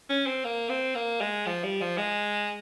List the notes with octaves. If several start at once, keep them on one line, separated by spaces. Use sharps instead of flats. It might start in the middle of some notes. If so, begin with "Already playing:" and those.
C#4
C4
A#3
C4
A#3
G#3
F3
G3
F3
G#3